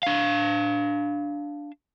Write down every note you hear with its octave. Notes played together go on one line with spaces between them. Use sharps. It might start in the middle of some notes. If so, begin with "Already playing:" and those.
D4 F5